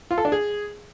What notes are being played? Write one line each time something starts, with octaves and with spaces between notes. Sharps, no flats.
F4
A4
D4
G#4